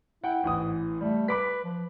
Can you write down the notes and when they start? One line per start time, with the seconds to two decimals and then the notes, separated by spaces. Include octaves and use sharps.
0.24 E4 F#5 G5
0.43 A1 G#2 E3 D#6
1.01 G3 A3
1.28 B4 B5 D6 B6
1.64 F3